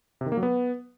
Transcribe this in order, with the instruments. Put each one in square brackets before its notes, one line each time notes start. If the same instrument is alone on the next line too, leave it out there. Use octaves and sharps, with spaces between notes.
[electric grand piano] C3
D#3
A#3
F#3
B3